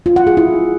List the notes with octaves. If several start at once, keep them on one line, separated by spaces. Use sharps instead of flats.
F4
F#5
G#4
E4